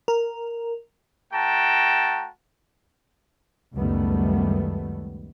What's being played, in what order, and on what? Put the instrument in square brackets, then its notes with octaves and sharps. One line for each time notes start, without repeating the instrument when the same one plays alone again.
[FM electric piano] A#4
[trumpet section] A3 F#4 G5 A5 A#5
[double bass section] C#2 F#2 D#3 G3 A3 B3